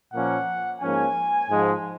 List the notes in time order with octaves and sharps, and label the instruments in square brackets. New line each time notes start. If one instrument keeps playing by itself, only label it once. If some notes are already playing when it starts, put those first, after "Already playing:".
[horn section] A#2 F3 A#3 C#4 F#5
G#2 F3 A#3 C#4 G#5
G#2 F3 G#3